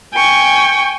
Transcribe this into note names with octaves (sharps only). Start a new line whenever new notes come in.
G5 G#5 C#6